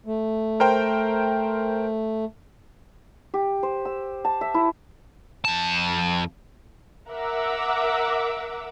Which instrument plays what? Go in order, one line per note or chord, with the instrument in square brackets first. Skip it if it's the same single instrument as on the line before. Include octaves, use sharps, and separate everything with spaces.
[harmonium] A3
[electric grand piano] A#4 C5 G5
[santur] G4
C5
E6
A5
E5
E4
[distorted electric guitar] F2 A5
[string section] A#4 E5 F#5 D6 E6